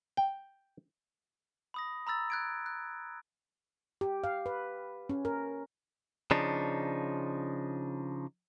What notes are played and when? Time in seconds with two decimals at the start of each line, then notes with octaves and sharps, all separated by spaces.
0.17 G5
1.74 B5 D#6 A#6
2.07 A#5 B5 E6 A6
2.30 F#6 G#6 D7
2.66 F#6
4.01 G4
4.24 F5
4.46 B4
5.09 C#4
5.25 A#4
6.31 C#3 F3 D4 D#4